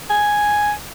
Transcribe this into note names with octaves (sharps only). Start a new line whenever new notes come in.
G#5